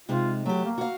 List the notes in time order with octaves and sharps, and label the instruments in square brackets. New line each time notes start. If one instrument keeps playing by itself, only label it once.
[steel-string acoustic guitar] C3 G#3 D#4 [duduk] F4
[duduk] F#3 [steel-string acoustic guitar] A3 G4
[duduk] A#3
[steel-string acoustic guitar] F#4 F5